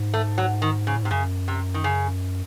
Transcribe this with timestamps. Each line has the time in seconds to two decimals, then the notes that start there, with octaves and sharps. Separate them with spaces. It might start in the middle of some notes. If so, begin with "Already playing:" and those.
Already playing: G#2
0.14 A3
0.38 F#3
0.62 D#3
0.87 C#3
0.93 A2
1.03 G#2 C3
1.11 F#2 C#3
1.48 C3
1.74 D#3
1.84 C#3